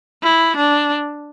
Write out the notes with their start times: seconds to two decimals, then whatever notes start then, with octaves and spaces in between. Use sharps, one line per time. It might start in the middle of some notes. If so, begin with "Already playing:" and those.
0.23 E4
0.57 D4